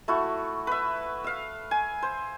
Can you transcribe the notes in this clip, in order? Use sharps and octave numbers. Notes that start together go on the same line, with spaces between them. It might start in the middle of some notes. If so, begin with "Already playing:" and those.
A3 E4 F#4
B4 E5
E5 F5
G#5
C5